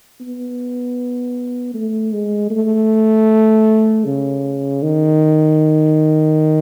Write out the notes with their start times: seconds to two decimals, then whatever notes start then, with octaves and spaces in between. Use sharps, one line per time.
0.21 B3
1.74 A3
2.12 G#3
2.50 A3
4.05 C#3
4.82 D#3